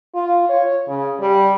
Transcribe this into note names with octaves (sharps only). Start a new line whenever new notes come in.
F4
C#5
C#3
G3